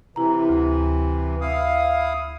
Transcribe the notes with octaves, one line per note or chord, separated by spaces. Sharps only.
C3 E3 E4 A#5
D2
E4 F5 D#6